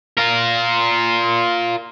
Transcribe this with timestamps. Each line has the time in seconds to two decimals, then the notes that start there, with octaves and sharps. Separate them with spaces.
0.17 F4 A#4